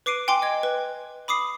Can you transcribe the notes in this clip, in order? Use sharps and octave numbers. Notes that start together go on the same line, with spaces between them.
B4 D6 C7 D7 D#7
G5 G#5 C6 D6
D#5 G#6
B4
B5 D6 D#6 C7